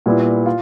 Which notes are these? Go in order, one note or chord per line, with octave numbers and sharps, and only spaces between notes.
A#2 G3 B3 E4
F4